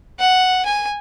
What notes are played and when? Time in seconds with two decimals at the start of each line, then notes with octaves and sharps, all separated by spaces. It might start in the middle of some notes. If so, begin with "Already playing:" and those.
0.19 F#5
0.66 G#5